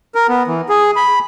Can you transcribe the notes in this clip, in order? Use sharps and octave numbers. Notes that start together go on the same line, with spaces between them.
A#4
B3
E3
G#4
B5